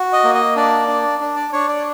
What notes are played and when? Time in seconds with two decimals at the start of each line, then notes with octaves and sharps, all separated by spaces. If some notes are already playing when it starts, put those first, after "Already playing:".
Already playing: F#4
0.13 D#5
0.24 A#3
0.35 D#5
0.56 D4 D5
0.88 D4
1.20 D4
1.36 D5
1.53 D4 C#5
1.68 D5